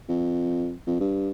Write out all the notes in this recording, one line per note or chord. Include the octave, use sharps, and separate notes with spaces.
F2
F2
G2